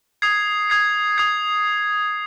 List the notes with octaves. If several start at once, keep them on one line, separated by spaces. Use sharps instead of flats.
D#6 G#6 C7
D#6 G#6 C7
D#6 G#6 C7